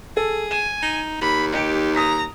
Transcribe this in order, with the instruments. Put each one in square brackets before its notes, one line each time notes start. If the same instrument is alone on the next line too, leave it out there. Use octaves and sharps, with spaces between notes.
[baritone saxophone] G#4 [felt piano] A4
[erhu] G#5 [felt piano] E7
[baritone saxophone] D#4
[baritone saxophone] D#2 [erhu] B5
[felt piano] D#4 C#7 D7 [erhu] G4
[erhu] A#5 [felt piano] D#6 B6